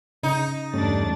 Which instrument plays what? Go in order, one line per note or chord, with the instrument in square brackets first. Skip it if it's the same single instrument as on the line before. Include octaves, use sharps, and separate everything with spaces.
[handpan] C#3 [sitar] D#4
[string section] E2 D4 A6 [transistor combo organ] G2 A3 C#4